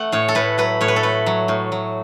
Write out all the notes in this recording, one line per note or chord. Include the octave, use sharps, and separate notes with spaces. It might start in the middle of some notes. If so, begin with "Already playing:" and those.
Already playing: A3 F#5
A2 C#5
A4
A2 B4
F#3 B4
A2 C#5
B4
A4
A3 B4
F#3
A2
F#3